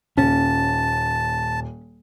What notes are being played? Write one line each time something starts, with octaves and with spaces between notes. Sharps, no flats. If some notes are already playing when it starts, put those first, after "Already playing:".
D#1 C#4 A5